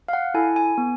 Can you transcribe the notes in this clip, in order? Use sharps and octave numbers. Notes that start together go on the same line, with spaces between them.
F5
F#5
E4 A4 G#5
G#5
B3